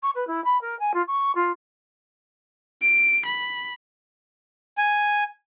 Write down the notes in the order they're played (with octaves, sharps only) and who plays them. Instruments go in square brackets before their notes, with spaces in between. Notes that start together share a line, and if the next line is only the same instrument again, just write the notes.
[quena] C#6
B4
E4
B5
A#4
G#5
F4
C#6
F4
[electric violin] D7
B5
[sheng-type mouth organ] G#5